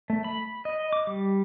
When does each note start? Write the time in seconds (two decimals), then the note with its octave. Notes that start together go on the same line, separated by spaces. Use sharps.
0.10 A3
0.24 B5
0.65 D#5
0.93 D6
1.07 G3